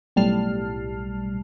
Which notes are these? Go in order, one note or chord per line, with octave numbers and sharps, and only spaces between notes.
B1 A2 G3 A5 F6 C7